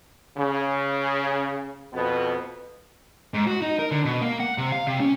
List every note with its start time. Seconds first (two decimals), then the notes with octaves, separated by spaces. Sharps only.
0.38 C#3
1.93 F2 B2 B3
3.34 G#2
3.47 F#4
3.62 D#4
3.79 A#4
3.91 D3
4.05 B2
4.22 A#3
4.40 F#5
4.58 C3
4.72 F5
4.87 C3
5.00 C#4